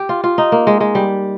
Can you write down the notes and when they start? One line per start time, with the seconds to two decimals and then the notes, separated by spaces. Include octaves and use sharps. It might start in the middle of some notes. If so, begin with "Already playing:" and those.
Already playing: G4
0.09 F4
0.24 F4
0.38 D#4
0.52 A#3
0.67 G#3
0.80 G#3
0.95 G3